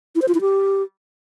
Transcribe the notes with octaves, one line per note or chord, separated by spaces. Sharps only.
E4
C5
F4
E4
G4